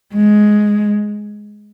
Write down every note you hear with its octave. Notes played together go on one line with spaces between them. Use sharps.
G#3